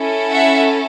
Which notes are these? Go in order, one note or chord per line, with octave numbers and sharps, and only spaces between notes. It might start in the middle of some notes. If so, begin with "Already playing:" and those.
Already playing: C#4 E4 A4
E5 F#5